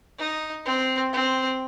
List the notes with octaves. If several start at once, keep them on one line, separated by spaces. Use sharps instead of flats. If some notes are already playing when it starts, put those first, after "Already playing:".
D#4
C4
C4